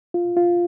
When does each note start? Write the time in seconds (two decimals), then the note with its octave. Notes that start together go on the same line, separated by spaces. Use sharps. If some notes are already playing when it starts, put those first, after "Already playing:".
0.14 F4
0.37 F4